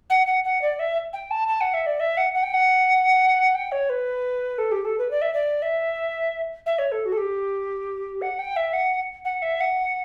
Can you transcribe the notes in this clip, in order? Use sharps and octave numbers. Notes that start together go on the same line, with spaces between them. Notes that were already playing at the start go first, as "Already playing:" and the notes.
F#5
F#5
F#5
D5
E5
G5
A5
A5
F#5
E5
D5
E5
F#5
F#5
G5
F#5
G5
C#5
B4
A4
G4
A4
B4
D5
E5
D5
E5
E5
C#5
A4
F#4
A4
G4
F#5
G5
E5
F#5
F#5
E5
F#5